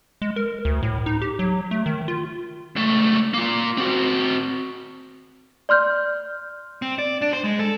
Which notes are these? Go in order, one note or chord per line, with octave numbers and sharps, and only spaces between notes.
G#3
A#4
D2
A2
D#4
G4
F#3
A3
D#3
F4
C#2 A3
A#3 F4
C4 F#4
D5 C6 F6 G6
C4
D5
D4
C5
G#3
A4